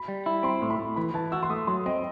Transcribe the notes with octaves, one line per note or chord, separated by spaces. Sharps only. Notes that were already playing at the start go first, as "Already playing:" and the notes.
Already playing: B5
G3
E4
C4 C6
A2
B5
A2
E3 B5
E3 A5
F#4 E6
C6
A3 D#6
F#3 C6
C4 D#5